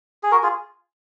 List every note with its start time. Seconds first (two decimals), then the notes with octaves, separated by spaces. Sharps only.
0.23 G#4
0.32 F#4 A#4
0.43 F4 G#4